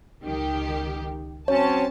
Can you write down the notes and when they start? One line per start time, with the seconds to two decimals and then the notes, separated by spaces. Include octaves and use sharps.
0.23 C#2 D#3 G4
1.48 F#3 C4 C#4 C#5 A5